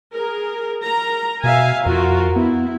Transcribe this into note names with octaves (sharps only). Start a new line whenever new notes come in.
G#4 A#4
A#4 A#5
B2 E5 F5 G#5
F2 F4 F#4 A#4
B3 E4